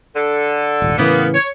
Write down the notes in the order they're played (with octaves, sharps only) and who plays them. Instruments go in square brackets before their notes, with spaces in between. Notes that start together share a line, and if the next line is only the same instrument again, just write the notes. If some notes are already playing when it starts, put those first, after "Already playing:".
[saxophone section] D3 A4
[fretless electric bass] D#1 G#1
[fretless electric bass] A2 C#3 E3 [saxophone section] A#3 B3
[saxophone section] C#5